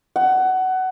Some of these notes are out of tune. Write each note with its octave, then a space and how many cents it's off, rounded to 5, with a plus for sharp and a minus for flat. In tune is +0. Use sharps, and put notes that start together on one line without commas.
F#5 +20